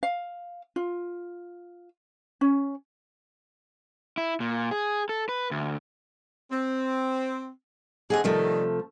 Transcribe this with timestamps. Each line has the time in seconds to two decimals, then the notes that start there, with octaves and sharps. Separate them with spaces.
0.03 F5
0.76 F4
2.41 C#4
4.17 E4
4.40 A#2
4.71 G#4
5.09 A4
5.29 B4
5.51 D2
6.51 C4
8.10 D3 C4 G#4 D#5 F#5 G#5
8.24 C3 D#3 F3 G3 A3